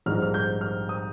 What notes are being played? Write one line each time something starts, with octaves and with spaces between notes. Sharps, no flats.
A#1 G#2 G3 C4 D#4 F6
F6
G6
F6
D#6